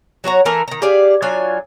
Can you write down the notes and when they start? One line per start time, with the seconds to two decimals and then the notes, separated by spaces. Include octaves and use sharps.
0.24 F#3 F#4 C#5 A#5
0.45 E3 A3 A#4 G#5
0.68 D#3 A#5
0.82 G4 G#4 D5 F5
1.22 F#3 D4 F4 G#5